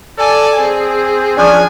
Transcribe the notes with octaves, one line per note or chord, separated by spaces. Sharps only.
A4 D5 G#5
C4 G#4 D5
F3 C#4 D4 G#5